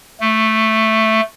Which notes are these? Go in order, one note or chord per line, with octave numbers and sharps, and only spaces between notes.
A3